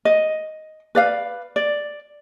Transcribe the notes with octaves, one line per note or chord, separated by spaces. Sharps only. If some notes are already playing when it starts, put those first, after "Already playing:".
D#5
B4 D5 F5
D5